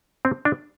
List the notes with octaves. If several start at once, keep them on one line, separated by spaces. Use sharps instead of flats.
C4
D4